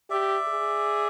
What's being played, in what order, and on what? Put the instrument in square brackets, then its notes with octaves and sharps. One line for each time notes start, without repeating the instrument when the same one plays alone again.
[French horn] G4 [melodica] D5 E5
[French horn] G#4